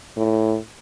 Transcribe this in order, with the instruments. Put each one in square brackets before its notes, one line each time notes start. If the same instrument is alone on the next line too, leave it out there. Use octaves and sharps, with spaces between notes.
[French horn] A2